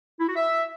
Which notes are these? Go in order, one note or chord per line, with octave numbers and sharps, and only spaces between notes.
E4
F#4
E5